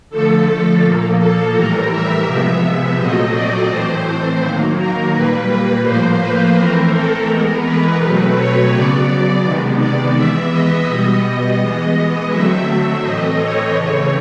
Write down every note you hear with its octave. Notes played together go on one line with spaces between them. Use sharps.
D3 F3 A3 A4
A#2 F3 A#3
A4
A2 E3 G3 A#4
E5
C3 F3 G#3 B3
E5
A#2 F#3 A3 C4 D#5
D5
A2 E3 A3 C4 C5
D#3 F#3 A#3
A#4
A#2 G3 A#3 B4
B4
A2 F3 A#3 C5
B4
E3 A3 C4 A#4
A4
E3 G#3 B3 A#4
B4
B2 F#3 A3 C4
C#5
C#3 F#3 B3 D5
C3 D#3 G#3 B3
D5
E3 G#3 B3 E5
D#5
B2 G3 B3
D#5
E3 G#3 B3
D3 F#3 A3 C4 E5
A2 E3 A3 C4 D#5
C#5
C#3 E3 A3 C4